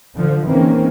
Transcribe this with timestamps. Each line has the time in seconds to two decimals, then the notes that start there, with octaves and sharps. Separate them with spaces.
0.16 D3 F3
0.48 D#3 E3 G#3 A#3 C4 C#4